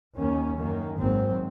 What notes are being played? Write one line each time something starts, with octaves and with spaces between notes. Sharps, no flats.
D#2 D#3 A#3 C#4
F#2 D#3 A#3
G#1 G#2 F#3 C4